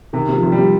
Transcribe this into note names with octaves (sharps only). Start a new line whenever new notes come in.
C3 D#3
C3
F3
C3
G3
C3